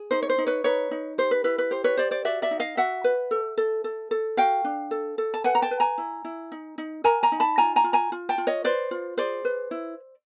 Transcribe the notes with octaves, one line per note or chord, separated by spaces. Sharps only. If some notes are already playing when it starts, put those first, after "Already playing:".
Already playing: G#4
D#4 C5
C#5
C5
D#4
B4 C#5
D#4 B4 C#5
D#4
G4 C5
B4
E4 B4
B4
G4 C5
B4 C#5
G4 C5 D5
C5 D5
F#4 D5 E5
D5 E5
D#4
D#5 F5
F#4 E5 F#5
B4
A4
A4
A4
A4
F#4 F5 G5
D4
A4
A4
A5
B4 F#5 G#5
A#5
G5 A5
B4
G#5 A#5
E4
E4
D#4
D#4
A#4 G#5 A#5
G#5 A#5
D#4
A5 B5
F4 G#5 A#5
G#5 A#5
F4
G#5 A#5
F4
G5 A5
F4
C#5 D#5
B4 C5 D5
F4
G#4 C5 D5
B4
E4